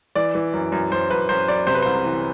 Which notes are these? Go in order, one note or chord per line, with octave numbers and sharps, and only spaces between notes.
E3 D5
E3
F#2
F#2
F#2 C5
F#2 B4
F#2 C5
F#2 D5
C3 C5
B4
C2 C5
E3